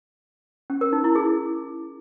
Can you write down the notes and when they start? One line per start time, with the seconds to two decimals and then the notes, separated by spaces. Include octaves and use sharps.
0.70 C#4
0.81 A#4
0.93 D#4
1.04 E4
1.16 G#4